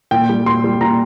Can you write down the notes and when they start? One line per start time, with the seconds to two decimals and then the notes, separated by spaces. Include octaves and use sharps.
0.11 A#2 G5
0.29 G3
0.46 A#2 C6
0.64 G3
0.81 A#2 A#5